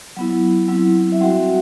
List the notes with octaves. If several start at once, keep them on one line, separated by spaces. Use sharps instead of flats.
F#3 B3 E4
F#3 C4 E4
E5
G3 C4 F#4 F#5